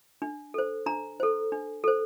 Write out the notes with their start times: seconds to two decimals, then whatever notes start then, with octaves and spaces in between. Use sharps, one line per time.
0.22 D4
0.54 A4 C5
0.86 D4 A#5
1.20 A4 C5
1.52 D4
1.84 A4 C5